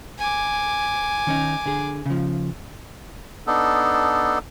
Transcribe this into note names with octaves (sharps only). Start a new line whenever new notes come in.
G#5 D6
D#3 C#4 D#4
D3 G#4
C#3 F3
B3 D4 D#4 A4